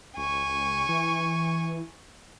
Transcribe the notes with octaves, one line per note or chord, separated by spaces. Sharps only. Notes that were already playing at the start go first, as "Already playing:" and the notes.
C#2 G#5 C#6
E3